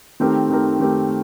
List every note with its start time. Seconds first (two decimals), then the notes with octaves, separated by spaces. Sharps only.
0.20 D#3 A3 C4 G4 A#4
0.50 D#3 A3 C4 G4 A#4
0.80 D#3 A3 C4 G4 A#4